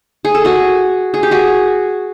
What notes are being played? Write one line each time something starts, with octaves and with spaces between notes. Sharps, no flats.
G#4
A4
F#4 G#4
G#4
G4
F#4 G#4